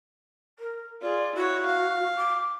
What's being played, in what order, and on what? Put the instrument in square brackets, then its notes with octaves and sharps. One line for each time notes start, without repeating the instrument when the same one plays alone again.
[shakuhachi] A#4
[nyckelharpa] F4 G#4 [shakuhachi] D5
[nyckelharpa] E4 C#5 [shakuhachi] F#4
[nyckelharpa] F5
[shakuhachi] D6